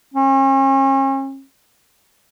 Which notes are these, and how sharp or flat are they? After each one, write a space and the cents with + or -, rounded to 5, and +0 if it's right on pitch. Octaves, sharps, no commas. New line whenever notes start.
C#4 -40